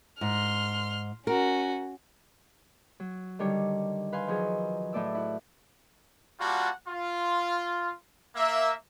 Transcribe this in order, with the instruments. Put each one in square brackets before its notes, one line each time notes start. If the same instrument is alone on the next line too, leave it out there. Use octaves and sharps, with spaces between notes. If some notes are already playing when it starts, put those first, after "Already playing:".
[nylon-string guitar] G#2 [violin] C6 F6
[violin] C#4 F#4 [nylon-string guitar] A#4
[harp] F#3
D3 D#3 G3 C#5
B4 F5 G#5 C6
D#3 F3 F#3 G#4
A2 A3 D5 E6
E4 F#4
[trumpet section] G3 A#3 F4 F#4 F#5 A5
F4
A#3 E5